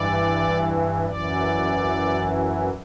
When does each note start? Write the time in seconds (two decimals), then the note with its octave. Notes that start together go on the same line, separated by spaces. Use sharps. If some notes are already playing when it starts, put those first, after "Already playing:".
Already playing: G2 E3 D5
1.06 F#2 E3 D5